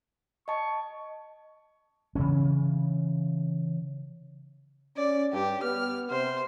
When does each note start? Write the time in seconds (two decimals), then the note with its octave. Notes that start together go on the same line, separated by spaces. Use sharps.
0.48 D#5 A5 C#6
2.15 C#3 E3 C#4
4.97 C#4 D5
5.33 G2 G4
5.63 B3 F6
6.11 C3 C5